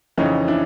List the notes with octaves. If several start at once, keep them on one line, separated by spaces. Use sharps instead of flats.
F2 C#3 E3 C#4 D#4
D4 E4